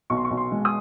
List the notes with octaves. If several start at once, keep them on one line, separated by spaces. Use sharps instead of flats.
B1 C#6
C6
C#6
B1
C6
G#3
D#6